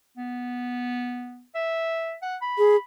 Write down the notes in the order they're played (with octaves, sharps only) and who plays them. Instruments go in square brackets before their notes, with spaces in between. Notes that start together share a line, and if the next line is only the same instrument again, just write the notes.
[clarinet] B3
E5
F#5
B5
[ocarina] G#4